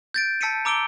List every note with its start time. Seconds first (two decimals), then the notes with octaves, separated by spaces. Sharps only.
0.14 G6 A6 D7
0.41 A5 E6 B6 C#7 D#7
0.65 A#5 D6 E6 D7 G7